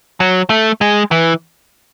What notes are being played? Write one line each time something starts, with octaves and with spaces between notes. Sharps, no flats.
F#3
A3
G#3
E3